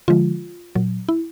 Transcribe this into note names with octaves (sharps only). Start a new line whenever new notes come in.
D3 F3 G#3 F4
A#2 F#3
E4